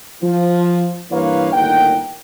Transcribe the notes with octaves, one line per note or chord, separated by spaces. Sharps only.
F3
G2 E3 A#3 B4 C#5 F5
G1 D#2 A2 A#4 F#5 G5